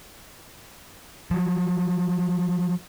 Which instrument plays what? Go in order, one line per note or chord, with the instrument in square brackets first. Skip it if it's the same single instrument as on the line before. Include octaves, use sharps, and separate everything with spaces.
[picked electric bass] F3 F#3